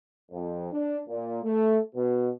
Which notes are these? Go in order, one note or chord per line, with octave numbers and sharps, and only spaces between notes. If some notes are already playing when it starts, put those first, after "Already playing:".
F2
D4
A#2
A3
B2